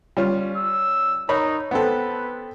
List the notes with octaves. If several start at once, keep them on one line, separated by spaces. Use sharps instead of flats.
G3 C#4 F4
E6
D#4 A#4 C#5 B5
B3 C4 A4 B4